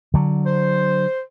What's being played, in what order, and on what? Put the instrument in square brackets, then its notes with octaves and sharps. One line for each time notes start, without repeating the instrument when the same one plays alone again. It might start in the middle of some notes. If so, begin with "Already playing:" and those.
[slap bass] D3 F#3
[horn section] C5